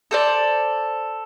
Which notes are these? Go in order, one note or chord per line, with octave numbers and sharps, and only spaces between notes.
A4 C5 D5